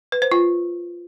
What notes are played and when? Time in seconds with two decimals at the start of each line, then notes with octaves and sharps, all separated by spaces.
0.12 B4
0.22 C5
0.32 F4